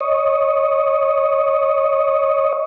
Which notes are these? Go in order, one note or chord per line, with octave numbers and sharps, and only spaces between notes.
C#5 D#5